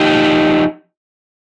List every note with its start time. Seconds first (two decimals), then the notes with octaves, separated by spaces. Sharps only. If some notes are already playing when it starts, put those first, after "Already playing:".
Already playing: F3 D#4 G4